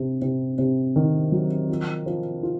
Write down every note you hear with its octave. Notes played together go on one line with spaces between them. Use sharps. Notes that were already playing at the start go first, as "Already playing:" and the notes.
Already playing: C3
C3
C3
D#3
F#3
F3
F3
F4